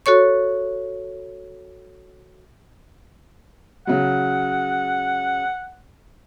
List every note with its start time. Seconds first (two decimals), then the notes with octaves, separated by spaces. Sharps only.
0.06 F#4 A4 C#5 C#6
3.87 C#3 F#3 F#5